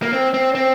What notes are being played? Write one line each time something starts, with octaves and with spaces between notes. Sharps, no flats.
A#3
C4
C4
C4